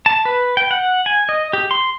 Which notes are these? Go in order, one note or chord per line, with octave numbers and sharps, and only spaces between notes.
A5
B4
G5
F#5
G#5
D#5
G4
C6